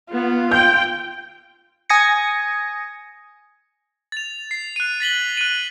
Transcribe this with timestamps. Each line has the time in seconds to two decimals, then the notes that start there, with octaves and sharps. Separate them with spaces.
0.12 B3 F4
0.52 G5 G6
1.89 G#5 D#6 G#6 A#6 C#7
4.12 A6 F7
4.51 C7
4.76 F#6 D#7
5.00 A6 B6 F#7 G7
5.37 F#6 D#7